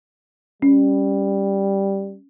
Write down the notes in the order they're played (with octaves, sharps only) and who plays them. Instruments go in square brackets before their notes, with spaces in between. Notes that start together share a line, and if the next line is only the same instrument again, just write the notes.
[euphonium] G3 [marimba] C#4